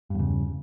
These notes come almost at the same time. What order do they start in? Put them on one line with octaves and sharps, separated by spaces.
G2 E2 C#3